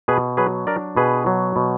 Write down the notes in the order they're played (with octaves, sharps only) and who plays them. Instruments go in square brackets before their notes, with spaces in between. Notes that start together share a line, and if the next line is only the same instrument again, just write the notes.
[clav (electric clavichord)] B2 G#4 B4
F#3 G#4 B4
D4 A#4 D5
B2 G#4 B4
F#3
B2